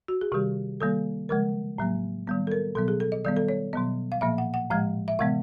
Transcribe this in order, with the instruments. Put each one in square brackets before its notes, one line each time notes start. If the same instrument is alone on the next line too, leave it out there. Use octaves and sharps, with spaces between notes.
[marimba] F#4
G#4
C3 D#3 G3 G4
D#3 G3 A#3 A4
C#3 F3 G#3 A#4
A2 F#3 A#3
D#3 G3 B3
A4
A#4
B2 F#3 B3 A4
G#4
A4
D#5
D#3 G3 B3 D5
A4
C#5
B2 F#3 B3 D#5
F5
A#2 F3 A#3 E5
F#5
F#5
A2 F3 G#3 F5
E5
C3 E3 G#3 B3 F5